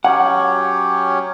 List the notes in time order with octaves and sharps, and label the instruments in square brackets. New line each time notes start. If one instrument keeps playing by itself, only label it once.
[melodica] F#3 C#4 G4 C#5 [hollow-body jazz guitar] F#5